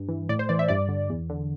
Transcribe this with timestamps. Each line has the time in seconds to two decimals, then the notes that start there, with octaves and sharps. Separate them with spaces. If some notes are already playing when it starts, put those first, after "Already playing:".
Already playing: G2
0.09 E3
0.29 A2 D5
0.39 C5
0.49 E3 D5
0.59 E5
0.68 G2 D5
0.88 D3
1.10 E2
1.30 D3